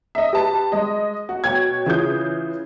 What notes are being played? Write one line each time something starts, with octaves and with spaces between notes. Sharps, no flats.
D#5 E5
G4 B4 A5
G#3 D#5
F#4
B2 C#5 G5 G#6
C#3 E3 F4 G#4 D#6 G6